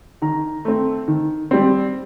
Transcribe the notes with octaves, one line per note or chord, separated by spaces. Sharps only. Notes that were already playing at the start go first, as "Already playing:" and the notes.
D#3 A#5
A3 C4
D#3
G3 C4